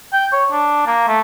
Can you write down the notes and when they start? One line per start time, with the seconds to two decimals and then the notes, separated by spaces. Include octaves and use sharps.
0.13 G5
0.33 C#5
0.52 D4
0.87 A#3
1.08 A3